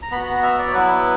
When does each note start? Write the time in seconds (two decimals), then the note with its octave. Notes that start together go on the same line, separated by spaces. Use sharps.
0.02 A#5
0.11 B3 B5
0.16 F#4
0.23 B5
0.28 A#5
0.42 E5
0.59 D5
0.68 C#5
0.73 F#3 B3 E4 B4